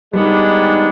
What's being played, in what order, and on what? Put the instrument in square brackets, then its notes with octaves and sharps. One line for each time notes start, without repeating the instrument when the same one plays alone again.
[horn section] G#2 D#3 G#3 B3 D4 [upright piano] G3